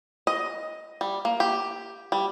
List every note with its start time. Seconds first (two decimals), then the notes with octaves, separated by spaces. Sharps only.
0.27 D#5
1.01 G3
1.25 A#3
1.40 G4
2.12 G3